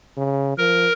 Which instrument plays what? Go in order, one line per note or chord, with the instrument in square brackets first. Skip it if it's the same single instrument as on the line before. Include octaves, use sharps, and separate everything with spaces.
[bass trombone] C#3
[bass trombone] F3 [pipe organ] A#4